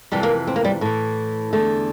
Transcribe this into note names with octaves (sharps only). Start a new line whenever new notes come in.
F2 C3 E3 G3
A#3
C4
A#3
G3
A2 E3
E2 D3 A3